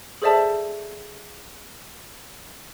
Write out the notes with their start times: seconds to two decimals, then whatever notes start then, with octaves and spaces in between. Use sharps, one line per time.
0.22 G#4 A4 C5 D5 E5 A5